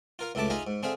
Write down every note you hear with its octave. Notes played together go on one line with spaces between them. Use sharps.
F4 A#4 F5
C#2 A2 C#3 E5 A5 D6
D#4 F4 G#4 E5 F5 A#5
G#2
D3 C4 G#4 E5 F5